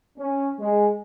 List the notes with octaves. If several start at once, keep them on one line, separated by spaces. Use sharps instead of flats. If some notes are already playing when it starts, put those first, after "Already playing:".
C#4
G#3